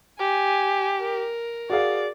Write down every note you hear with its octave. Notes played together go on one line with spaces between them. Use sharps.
G4 G#5
A#4
F#4 G#4 D5 F5